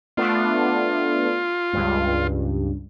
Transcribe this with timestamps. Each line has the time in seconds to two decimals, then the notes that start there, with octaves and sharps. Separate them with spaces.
0.17 A3 B3 D4 F4
1.73 C#2 G2